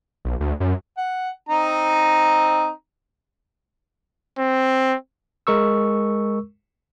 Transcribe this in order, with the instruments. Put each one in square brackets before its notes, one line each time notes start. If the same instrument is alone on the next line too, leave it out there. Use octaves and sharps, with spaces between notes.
[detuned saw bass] B1
D2
F#2
[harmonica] F#5
C4 D#4 A#5
[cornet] C4
[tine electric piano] G#3 A#4 C#6 E6